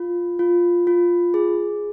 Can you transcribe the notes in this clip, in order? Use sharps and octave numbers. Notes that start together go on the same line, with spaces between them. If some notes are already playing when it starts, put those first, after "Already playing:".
Already playing: F4
F4
F4
G#4